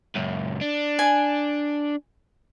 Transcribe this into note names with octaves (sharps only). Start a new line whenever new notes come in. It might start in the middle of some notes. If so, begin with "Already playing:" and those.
C#2 F#2
D4
G#5